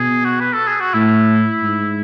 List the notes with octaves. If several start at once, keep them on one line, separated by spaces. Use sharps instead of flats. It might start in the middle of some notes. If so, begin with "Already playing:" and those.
Already playing: B2 G#4
F#4
B4
A4
G#4
F#4
A2 E4
G#2